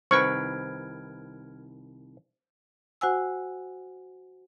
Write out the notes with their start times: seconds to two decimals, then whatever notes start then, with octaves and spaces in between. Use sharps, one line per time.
0.11 C2 D#3 B4 C5 C#6 F6 G#6 D7
3.01 F#4 C5 F#5 G#5 E6